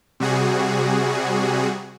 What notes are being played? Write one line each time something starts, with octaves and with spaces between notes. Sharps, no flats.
C3 G3 F#4 G#4